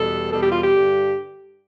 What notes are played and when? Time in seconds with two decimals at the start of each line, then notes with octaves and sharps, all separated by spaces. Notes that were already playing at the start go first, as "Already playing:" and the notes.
Already playing: E2 B2 G3 A4
0.32 E2 B2 G3 A4
0.42 G4
0.52 F4
0.61 G4
0.73 G2 D3 G3